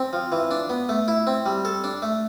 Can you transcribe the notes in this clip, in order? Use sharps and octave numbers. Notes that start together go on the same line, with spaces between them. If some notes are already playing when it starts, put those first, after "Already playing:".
Already playing: C4
F3
E3
D4
B3
A3
E4
C4
G3
A4
D4
A3